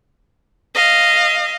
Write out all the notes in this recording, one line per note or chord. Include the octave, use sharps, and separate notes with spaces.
D#5 F5